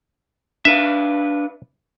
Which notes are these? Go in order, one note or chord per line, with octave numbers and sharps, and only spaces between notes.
D4 B4 E5 F5